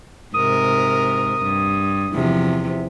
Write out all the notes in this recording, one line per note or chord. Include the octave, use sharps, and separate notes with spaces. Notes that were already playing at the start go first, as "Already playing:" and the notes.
G#2 C3 A#4 D#6
G2
E2 C3 F3